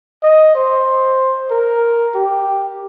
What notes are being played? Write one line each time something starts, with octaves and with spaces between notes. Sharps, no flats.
D#5
C5
A#4
G4